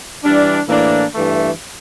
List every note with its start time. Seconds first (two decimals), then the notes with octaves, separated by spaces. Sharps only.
0.24 E3 G3 D4
0.68 A2 E3 A#3 D4
1.14 G2 E3 A3